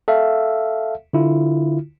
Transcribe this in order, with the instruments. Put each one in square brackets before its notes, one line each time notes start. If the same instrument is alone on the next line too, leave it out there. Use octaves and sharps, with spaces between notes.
[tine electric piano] A4 E5 F5
D3 E4 F4